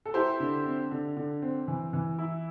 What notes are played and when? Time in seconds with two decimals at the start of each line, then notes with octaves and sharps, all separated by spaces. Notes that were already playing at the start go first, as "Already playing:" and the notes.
0.06 A4
0.14 E4 G4 C5
0.40 D3
0.66 C4
0.91 D3
1.17 D3
1.42 C4
1.68 E3
1.93 E3
2.18 E4